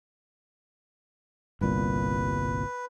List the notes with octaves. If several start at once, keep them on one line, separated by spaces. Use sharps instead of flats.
G1 C2 A#2 B4